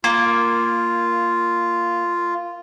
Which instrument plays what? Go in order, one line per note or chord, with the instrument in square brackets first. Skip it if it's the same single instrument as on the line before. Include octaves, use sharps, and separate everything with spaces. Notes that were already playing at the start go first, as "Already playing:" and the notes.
[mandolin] A#3 [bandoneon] F4